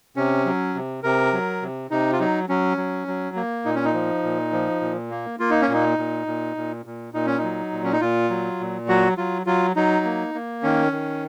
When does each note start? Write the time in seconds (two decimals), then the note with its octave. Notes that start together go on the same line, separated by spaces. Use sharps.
0.16 C3 C#4
0.45 F#3
0.75 C3
1.03 C3 A#4
1.33 F#3
1.62 C3
1.91 C3 D#4
2.12 F4
2.19 F#3 D#4
2.49 F#3 C#4
2.77 F#3
3.08 F#3
3.36 A#3
3.65 A#2 D#4
3.75 C#4
3.85 D#4
3.94 F3
4.23 A#2
4.53 F3
4.81 A#2
5.11 A#3
5.39 A#3 F4
5.50 D#4
5.62 C#4
5.69 A#2 D#4
5.98 A#2
6.27 A#2
6.56 A#2
6.86 A#2
7.14 A#2 D#4
7.26 C#4
7.38 D#4
7.44 F#3
7.72 A#2
7.84 C#4
7.92 D#4
8.01 A#2 F4
8.30 F#3
8.60 A#2
8.88 F#3 F#4
9.17 F#3 F4
9.46 F#3 F4
9.76 F#3 D#4
10.05 A#3
10.34 A#3
10.63 D#3 C#4
10.92 D#3